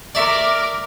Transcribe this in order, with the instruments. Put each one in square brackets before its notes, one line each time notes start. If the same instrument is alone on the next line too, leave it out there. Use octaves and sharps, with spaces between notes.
[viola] A#4 D6 [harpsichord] D5 E5